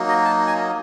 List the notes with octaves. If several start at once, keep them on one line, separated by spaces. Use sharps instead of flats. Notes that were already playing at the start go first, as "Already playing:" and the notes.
Already playing: F#3 A#3 D#4
D#5
A5
G#5